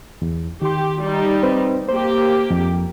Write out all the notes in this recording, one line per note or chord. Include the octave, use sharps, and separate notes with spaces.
E2
D#3 G4 C6
G3 D#4
C4 B4 C5
A#3 G4 C5
F2